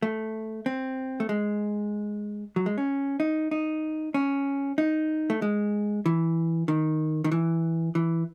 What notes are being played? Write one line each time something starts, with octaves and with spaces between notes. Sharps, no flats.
A3
C4
A3
G#3
F#3
G#3
C#4
D#4
D#4
C#4
D#4
A3
G#3
E3
D#3
D#3
E3
E3